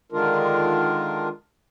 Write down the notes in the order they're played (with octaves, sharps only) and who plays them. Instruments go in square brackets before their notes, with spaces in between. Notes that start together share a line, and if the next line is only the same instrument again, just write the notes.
[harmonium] D3 D#3 G#3 D4 F4 A#4